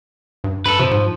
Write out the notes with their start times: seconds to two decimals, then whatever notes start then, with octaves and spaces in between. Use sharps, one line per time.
0.44 G2
0.66 G2 A4 B4
0.79 C3 F3
0.91 G#2